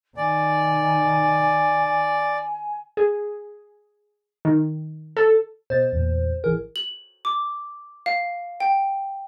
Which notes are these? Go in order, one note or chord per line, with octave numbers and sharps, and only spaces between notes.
D#3 D5 G#5
G#4
D#3
A4
B2 C5 D#5 A6
E2 A#2
A1 E3 G#4 A#4
F#7
D6
F5
G5